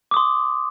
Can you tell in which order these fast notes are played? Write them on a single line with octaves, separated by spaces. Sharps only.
D6 D#6 C6